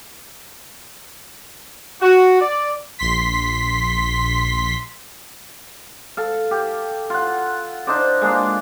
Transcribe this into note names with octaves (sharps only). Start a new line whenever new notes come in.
F#4
D5
A#1 C6 B6
A4 F5
G4
F4 F#5
D4 D#4 C5 D5
G#3 A#3 D4